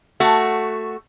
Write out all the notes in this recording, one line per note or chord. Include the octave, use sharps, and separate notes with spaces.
A3 F#4